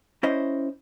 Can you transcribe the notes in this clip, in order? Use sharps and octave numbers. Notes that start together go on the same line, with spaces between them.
C#4 E4 C5 D#5